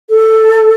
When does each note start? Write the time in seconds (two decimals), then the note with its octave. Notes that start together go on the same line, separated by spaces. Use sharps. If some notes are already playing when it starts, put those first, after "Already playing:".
0.09 A4